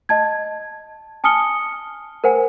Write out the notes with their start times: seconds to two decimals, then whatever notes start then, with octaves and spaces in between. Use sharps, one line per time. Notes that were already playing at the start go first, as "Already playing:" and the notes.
0.09 D#5 A5 G#6
1.24 G#5 A5 D#6 F6 C#7 G7
2.24 A#4 C5 F#5 G#5